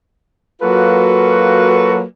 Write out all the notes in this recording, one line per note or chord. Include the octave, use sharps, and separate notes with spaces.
F#3 A#3 F4 F#4 A4 B4